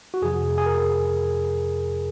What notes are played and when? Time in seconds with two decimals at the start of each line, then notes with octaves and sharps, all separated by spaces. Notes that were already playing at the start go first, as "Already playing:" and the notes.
0.14 F#4
0.22 F2 C3 F3 G#4
0.58 G#4
0.66 A#4
0.75 G#4